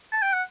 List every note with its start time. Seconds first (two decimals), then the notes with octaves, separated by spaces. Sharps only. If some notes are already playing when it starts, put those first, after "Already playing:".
0.12 A5
0.22 G5
0.33 F#5